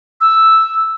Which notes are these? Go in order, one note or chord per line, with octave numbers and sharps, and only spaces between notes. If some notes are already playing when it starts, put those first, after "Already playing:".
E6